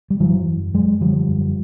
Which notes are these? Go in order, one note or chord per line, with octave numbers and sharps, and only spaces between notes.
G3
F#2 E3 F#3
F#2
F#2 F#3 G#3
D3 F3 G3
F#2